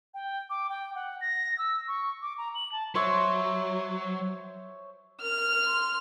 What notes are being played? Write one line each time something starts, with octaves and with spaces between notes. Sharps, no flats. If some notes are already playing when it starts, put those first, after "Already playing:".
G5
D6
G5
F#5
A#6
E6
C#6
D6
A#5
F#7
A5
F#3 C5 C#5 E5
A#4 F6
C6